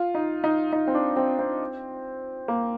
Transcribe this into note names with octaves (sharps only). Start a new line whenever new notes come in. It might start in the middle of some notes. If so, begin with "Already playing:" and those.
Already playing: F4
D#4
D#4
D#4
C4
D4
C4
C4
A#3